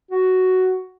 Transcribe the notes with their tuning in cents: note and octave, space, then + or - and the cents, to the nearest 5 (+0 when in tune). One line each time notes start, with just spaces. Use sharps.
F#4 +5